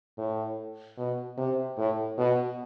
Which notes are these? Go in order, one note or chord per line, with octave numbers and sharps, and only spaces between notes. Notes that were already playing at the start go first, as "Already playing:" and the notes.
A2
B2
C3
A2
B2